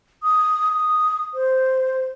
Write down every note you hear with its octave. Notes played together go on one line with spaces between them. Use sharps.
D#6
D#6
C5